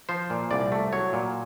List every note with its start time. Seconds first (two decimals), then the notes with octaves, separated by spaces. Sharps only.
0.09 F3 C5
0.30 A#2
0.51 C2 D5
0.72 A3
0.93 F#3 C#5
1.13 A#2